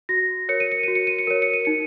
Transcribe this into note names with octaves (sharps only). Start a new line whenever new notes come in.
F#4 A#6
A#4 C#5 C#7
D#7
C#7
F#4 D#7
C#7
D#7
C#7
A#4 C#5 D#7
C#7
D#7
D#4 C#7